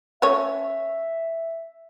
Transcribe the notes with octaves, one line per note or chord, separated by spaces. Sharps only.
A3 C#4 C#5 E5